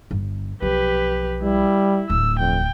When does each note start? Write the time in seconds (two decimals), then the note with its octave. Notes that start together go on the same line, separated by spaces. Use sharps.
0.11 G1
0.62 B1 F3 G4 B4
1.42 G3 E4
2.10 D1 D2 E6
2.39 F2 G5